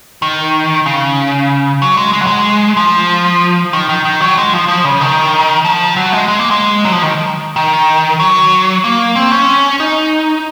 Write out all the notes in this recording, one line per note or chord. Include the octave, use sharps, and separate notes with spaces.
D#3
C#3
F#3
G#3
G#3
F#3
G#3
F3
D#3
D#3
D#3
F#3
G#3
F3
F3
C#3
D#3
F3
F#3
G#3
G#3
A#3
G#3
F#3
F3
D#3
D#3
F#3
A#3
C4
C#4
D#4